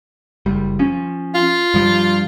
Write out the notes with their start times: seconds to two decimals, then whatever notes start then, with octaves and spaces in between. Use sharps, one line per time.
0.46 F#1 G3
0.79 F3 C#4
1.35 F4
1.74 G2 F3 G3